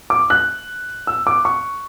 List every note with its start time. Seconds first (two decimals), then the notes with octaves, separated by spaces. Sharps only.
0.10 D6
0.30 F#6
1.07 E6
1.27 D6
1.45 C#6